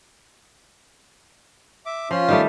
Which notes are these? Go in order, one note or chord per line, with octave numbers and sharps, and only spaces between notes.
E5 D6
F3 C#4 F4 C6
D#3 G3 A3